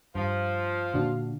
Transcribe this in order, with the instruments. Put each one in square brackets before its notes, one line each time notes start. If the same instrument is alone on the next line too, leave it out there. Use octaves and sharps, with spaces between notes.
[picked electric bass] G2 [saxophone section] F3 [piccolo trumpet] F5
[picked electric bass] A#2 D3 [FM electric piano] D4 F#4